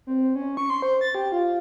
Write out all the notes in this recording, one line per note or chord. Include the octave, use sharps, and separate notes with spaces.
C4
C#4
C#6
C6
C5
A6
G4
F4